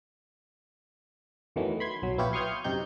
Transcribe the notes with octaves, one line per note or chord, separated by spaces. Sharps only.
E2 D#3 E3 F#3 A3 B3
B5 C6 G#6
B1 F#3
A#1 B3 E4 F4 G4 C#5
C6 C#6 D#6 F6 G6 G#6
F#2 C3 D#4 G4 G6